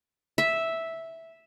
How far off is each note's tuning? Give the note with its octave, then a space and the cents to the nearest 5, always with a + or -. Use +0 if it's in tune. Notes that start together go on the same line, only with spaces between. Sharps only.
E5 -5